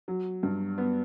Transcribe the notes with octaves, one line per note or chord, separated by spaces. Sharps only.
F#3
G2
B3